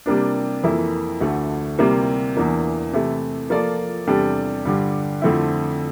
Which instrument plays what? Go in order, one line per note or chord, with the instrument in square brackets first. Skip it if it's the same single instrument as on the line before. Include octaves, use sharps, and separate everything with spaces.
[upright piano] C3 G3 A#3 D4
F2 E3 A#3 E4 A4
D2 D3 A3
C3 G3 A#3 E4
E2 E3 A#3 D4
C3 E3 A3 E4
F3 A#3 F4 A4 D5
E2 C3 G3 D4 A4
G2 D3 G3
F2 D3 A3 C4 E4